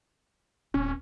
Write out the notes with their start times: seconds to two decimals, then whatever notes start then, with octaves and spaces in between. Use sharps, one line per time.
0.74 D1 C#4